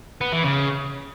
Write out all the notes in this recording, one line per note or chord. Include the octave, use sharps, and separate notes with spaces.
B3
E3
C#3